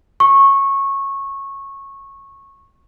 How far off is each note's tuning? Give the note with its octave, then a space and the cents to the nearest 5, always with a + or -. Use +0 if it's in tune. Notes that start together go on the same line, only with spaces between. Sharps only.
C#6 -15